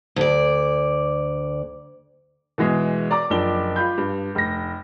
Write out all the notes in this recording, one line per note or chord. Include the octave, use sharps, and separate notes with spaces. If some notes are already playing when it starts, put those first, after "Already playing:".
D2 D5
B2 E3 G#3 G#4
D5 A#5 D6
F#1 F3 D4 G7
F4 B5 G6
G2
F1 A#6